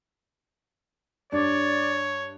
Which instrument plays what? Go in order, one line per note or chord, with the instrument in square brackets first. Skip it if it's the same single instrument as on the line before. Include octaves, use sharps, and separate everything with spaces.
[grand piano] G2 [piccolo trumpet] C#5 [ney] D5